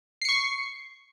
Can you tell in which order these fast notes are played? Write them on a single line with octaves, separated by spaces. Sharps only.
C7 C#7 C#6